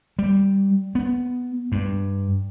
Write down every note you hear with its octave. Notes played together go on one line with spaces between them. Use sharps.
G3
B3
G2